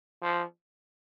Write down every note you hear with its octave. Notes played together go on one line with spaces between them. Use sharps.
F3